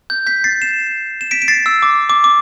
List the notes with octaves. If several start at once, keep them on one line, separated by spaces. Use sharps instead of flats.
G6
G6 B6
A6 C7
C7 E7
E7
B6 D7
D7
A6 C7
E6
D6
D6
D6